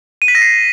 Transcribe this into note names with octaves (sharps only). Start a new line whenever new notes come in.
D#7
B6
A#6
C7